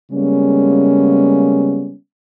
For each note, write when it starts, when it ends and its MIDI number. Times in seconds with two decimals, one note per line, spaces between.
0.12 1.93 49
0.12 1.93 55
0.12 1.93 56
0.12 1.93 58
0.12 1.93 59
0.12 1.93 61